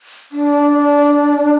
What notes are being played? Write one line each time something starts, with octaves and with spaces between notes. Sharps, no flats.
D4